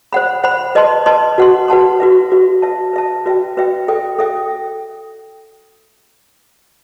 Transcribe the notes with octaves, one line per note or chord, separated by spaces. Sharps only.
C5 F#5 B5
C5 F#5 B5
B4 D#5 A5 C6
B4 D#5 A5 C6
F#4 B4 F#5 A5 C6
F#4 B4 F#5 A5 C6
F#4 B4 E5
F#4 B4 E5
B4 E5 A5
B4 E5 A5
F#4 B4 E5 G5
F#4 B4 E5 G5
A4 E5 G5
A4 E5 G5